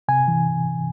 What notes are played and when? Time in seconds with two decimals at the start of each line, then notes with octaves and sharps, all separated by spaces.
0.08 C3 G#5
0.28 E3